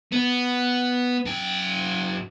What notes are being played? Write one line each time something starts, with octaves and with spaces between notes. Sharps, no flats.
B3
F#2 G5